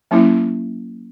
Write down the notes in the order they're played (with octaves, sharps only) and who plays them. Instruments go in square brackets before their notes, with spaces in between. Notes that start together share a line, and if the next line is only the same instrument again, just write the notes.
[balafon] F#3 A#3 C#4 E4